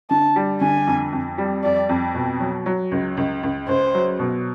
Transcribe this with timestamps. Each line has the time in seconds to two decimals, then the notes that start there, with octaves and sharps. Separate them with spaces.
0.10 D3 A5
0.36 G3
0.61 D3 G#5
0.87 F2
1.13 F2
1.38 G3
1.64 F2 D5
1.89 F2
2.15 B2
2.40 F#3
2.66 F#3
2.92 C#2
3.17 C#2
3.43 C#2
3.68 C#2 C5
3.94 F#3
4.19 B2